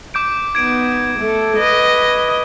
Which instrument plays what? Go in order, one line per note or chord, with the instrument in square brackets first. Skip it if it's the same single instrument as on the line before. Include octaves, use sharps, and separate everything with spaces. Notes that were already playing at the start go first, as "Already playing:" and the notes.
[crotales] D6 G6 D7
[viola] B3 D#4 [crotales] G#6 D7
[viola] A3 A4
B4 D#5